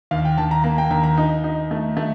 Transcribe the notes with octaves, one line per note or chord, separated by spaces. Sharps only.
D#2 F5
G5
D#2 A5
A#5
A#3 A#5
G5
D#2 A#5
A#5
D#4
D#4
A3
A3